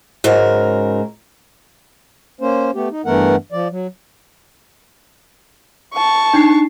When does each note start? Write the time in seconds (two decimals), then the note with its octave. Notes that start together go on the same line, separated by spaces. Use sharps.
0.24 G#2 C#3 F#3 A#4
2.41 A#3 C#4 C5
2.75 A3 B3 G4
2.91 D#4
3.05 G2 E3 A3 B3 A#4 F#5
3.52 F3 D5
3.71 F#3
5.94 A5 C#6
6.34 D4 D#4 C7